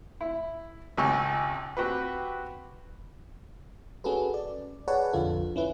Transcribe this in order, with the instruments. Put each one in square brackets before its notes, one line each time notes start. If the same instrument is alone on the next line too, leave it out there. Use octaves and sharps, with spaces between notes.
[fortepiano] E4
G#1 C#2 G4 D#5 G#5 C#6
C4 F#4 G4 B4
[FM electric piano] C#4 F#4 G#4 A4 B4
D5
G#4 B4 C#5 D5 F#5 A5
A1 F2 D3 F4 A4
C#4 E4 B4